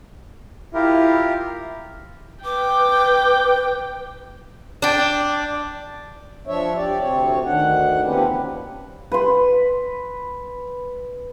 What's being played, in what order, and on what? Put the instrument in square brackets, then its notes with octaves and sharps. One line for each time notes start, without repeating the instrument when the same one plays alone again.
[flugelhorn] E4 [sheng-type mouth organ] F4 G4 A#4
[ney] B4 [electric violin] G5 [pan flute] D6
[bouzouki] D4 G5
[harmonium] F3 D4 C#5 E5
G4 D5
D2 C3 C4 C#5
D2 D#3 D4 F#5
F3 A#3 C4 C#4 G4 B4
[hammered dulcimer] B4 C6